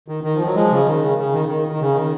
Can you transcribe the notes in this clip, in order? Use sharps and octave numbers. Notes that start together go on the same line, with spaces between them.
D#3
D#3
F3
F#3
F3 G#3
C#3
D#3
C#3
C#3
D#3
D#3
D#3
C#3
D#3